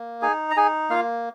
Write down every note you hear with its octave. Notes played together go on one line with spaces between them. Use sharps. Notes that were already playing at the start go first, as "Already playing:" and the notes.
Already playing: A#3
D#4 G#4 G#5
A#5
D#4 G#4 G#5
A#3 F4 F5